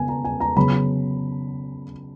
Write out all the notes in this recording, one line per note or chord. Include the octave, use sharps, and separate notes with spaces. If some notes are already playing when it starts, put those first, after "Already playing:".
Already playing: C#3 B3 G#5
A#5
G#5
A#5
C#3 F#3 B3 B5